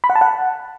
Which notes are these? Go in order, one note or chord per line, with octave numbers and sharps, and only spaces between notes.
B5
F#5
A5
F#5